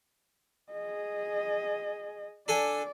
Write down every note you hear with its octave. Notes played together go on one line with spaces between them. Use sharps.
G#4 D#5
D4 A4 D5 G#5